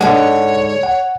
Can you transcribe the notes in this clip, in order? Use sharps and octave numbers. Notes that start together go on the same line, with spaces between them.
G#2 D3 G#3 C#5 F#5
F#5